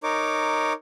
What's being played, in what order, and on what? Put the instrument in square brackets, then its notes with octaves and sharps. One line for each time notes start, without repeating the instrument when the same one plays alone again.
[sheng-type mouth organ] D#4 A#4 C#5 D6